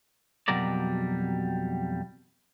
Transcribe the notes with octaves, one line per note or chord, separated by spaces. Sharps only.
F2 B2 F#3 G3 A#4 D5